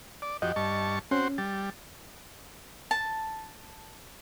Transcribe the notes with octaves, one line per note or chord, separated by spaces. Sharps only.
D5
F2 F#4 G4 D#5
G2 A5 C#6
C4 C#4 F#4 C5
G3 A6
A5